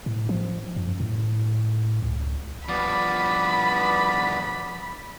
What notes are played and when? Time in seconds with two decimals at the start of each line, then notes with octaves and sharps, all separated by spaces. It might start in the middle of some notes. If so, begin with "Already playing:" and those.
0.06 A2
0.29 F3
0.76 F#2
1.00 A2
2.02 C#2
2.69 G2 F3 B3 D5 B5